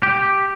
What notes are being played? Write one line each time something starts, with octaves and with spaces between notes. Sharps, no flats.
G4